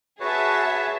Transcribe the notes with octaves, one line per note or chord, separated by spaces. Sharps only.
F#4 G#4 B4 C#5 E5 A5